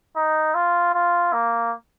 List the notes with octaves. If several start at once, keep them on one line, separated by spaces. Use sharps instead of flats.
D#4
F4
F4
A#3